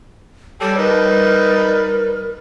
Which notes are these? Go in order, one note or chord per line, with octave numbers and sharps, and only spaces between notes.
G3 G4 A4 C#5
D#4 A#4 B4